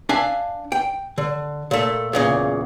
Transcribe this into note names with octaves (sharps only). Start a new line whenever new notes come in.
D4 E5 F5 G#5
G5
D3
A#2 A3
E2 A#2 C#3